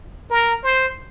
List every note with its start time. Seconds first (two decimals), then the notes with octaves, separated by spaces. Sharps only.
0.30 A#4
0.63 C5